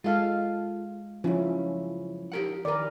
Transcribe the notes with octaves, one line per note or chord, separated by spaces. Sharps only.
G#3 F4 A4 F5
F#2 C#3 F3 C#4 E4
G4 A#4 F#5
D#3 A#4 B4 D5